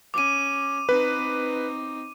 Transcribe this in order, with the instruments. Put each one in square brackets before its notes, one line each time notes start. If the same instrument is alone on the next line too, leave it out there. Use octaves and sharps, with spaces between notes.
[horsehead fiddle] C#4 [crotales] D6 D#7
[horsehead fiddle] C4 D#4 [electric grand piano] B4